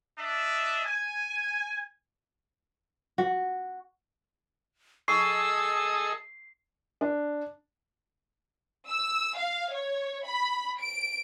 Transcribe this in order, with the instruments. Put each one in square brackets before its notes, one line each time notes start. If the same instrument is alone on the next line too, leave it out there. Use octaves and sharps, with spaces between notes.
[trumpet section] D4 D#5 E5
G#5
[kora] F#4
[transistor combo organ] G#4 A4 D#5 [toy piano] C#6 [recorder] E6 [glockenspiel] C7
[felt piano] D4
[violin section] E6
F5
C#5
B5
D7